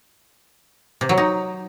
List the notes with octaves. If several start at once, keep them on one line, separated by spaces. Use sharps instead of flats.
C3
F#3
D#4